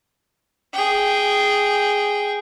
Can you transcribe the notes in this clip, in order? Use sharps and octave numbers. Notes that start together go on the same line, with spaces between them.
G#4 G5